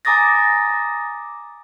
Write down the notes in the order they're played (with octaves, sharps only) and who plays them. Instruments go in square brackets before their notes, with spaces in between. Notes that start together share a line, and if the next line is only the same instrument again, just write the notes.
[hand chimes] G#5 A#5 D6 D#6 A6 A#6